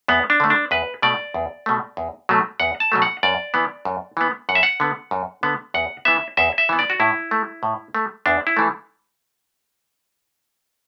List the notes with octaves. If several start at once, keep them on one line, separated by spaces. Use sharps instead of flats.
E2 B3
D4
D3 A3
D4
E2 B4
B2 A3 D5
E2
B2 A3
E2
B2 F#3 A3
E2 F#5
A5
B2 F#3 A3
F#5
F#2 D5
E3 B3
F#2
E3 B3
F#2 F#5
E5
F#5
D3 B3
F#2
D3 B3
E2 F#5
E3 B3 E5
E2 E5
E5
E3 B3
D5
F#4
A2 E4
A3
A2
A3
E2 D4
E4
E3 A3